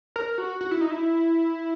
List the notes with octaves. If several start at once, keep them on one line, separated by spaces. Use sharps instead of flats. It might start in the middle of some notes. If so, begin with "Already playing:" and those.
A#4
F#4
F#4
E4
D#4
E4